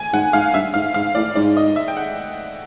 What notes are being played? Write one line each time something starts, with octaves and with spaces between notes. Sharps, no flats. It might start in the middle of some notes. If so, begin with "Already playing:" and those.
Already playing: G#5
G#2 F#5
G#2 F5
G2 E5
G#2 F5
G#2 F5
A2 D5
G#2 D5
D#5
E5
G5
F#5